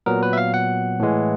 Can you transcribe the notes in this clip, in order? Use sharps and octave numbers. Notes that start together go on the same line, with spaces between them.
A#2 F#3 B3 A#4
B4
E5
F5
F#5
A2 E3 G#3